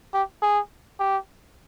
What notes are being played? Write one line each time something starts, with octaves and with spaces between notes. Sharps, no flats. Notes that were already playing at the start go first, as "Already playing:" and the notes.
G4
G#4
G4